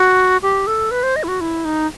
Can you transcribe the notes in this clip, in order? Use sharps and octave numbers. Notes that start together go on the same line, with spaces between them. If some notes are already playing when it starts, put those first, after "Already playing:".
Already playing: F#4
G4
A4
B4
C5
D#5
E4
F#4
E4
D#4